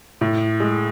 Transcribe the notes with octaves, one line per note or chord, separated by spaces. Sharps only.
A2
G#3